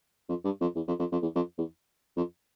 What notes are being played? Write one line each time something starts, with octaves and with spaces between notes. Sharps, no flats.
F2
G2
F2
E2
F2
F2
F2
E2
F2
E2
F2